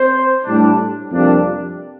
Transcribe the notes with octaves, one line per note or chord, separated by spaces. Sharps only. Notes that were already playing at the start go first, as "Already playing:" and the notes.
Already playing: C4 C5
A2 G3 D4
F2 C3 G3 A#3 D4